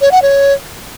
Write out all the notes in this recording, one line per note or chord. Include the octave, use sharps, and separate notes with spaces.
C#5
F#5
C#5